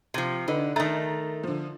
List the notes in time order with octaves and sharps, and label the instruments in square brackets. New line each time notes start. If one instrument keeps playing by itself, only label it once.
[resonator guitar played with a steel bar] C3 F3
[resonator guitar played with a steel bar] D3 [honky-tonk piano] D#4 B4
[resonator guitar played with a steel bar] D#3 A3 [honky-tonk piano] A#5 A6
[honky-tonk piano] D3 F3